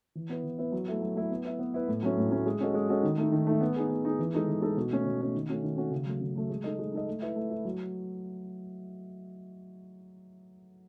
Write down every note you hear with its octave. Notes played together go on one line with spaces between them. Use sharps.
E3
B3 E4 B4
E3
B3 E4 B4
F#3
A3 E4 A4
F#3
A3 E4 A4
B3
E4 B4 E5
B3
E4 B4 E5
A2
F#3 A3 C#4
A2
F#3 A3 C#4
G#3
C#4 F#4 A4 D#5
G#3
C#4 F#4 A4 D#5
D#3
A3 D#4
D#3
A3 D#4
B3
D#4 G#4
B3
D#4 G#4
E3
G#3 D#4 A4
E3
G#3 D#4 A4
B2
A3 C#4
B2
A3 C#4
D#3
A3 C#4 F#4
D#3
A3 C#4 F#4
C#3
F#3 A3
C#3
F#3 A3
G#3
D#4 A4 D#5
G#3
D#4 A4 D#5
A3
E4 B4
A3
E4 B4
F#3